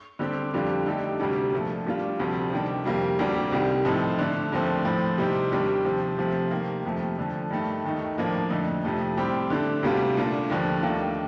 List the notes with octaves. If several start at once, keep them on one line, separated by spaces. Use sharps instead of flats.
D3 G3 C4 G4
F2 D3 G3 D4 F4
D3 A3 D#4 G4
D2 C3 G3 D4
A#2 F3 A3
A#2 G3 D4 F4
D2 C3 F3 C4
C3 D#3 G3 D4
F2 C3 G3 A#3 F4
D2 C3 G3 D4 G4
C2 C3 D#3 G3
A2 F3 A3 C4 D#4
D3 A3 D4
D#2 D3 F3 A3 C4
A2 F3 C4
C3 G3 C4 D#4 G4
D#2 D#3 G3 D4
C3 F3 C4
C3 F3 A3 C4
C3 D#3 A#3
F2 C3 F3 A3
D3 F3 A3
G2 D#3 A3
D#2 D#3 A3 D#4
A2 F3 A#3 D4
F2 D3 A3 D#4
F2 C3 F3 A3
A2 G3 C4 G4
D3 A3 D4
D2 C3 G3 D4 F4
A#2 A3 D4 F4
D#2 D3 F3
D#2 D#3 A3 D4 F4